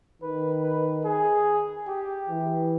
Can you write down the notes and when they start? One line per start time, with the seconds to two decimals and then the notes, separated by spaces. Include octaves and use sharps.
0.22 D#3 B4
0.63 B4
1.05 G#4
1.87 G4
2.28 E3